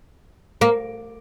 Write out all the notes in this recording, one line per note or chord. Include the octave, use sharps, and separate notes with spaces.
A#3